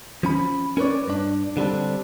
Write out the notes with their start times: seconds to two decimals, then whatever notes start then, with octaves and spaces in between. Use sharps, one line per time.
0.23 F3 C#4 B5
0.77 C#4 A#4 B4 C#5 D5
1.08 G2 D4
1.57 D3 G3 C4 D4